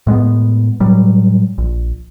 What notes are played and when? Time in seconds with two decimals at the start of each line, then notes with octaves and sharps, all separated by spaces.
0.07 A2 G#3 A3 B3
0.80 A2 F#3 G3
1.58 A#1